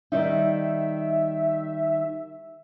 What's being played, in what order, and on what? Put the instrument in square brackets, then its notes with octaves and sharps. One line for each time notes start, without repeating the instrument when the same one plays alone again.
[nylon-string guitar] D#3 G3 D#4 [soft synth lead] E5